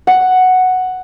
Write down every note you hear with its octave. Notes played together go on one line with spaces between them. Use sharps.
F#5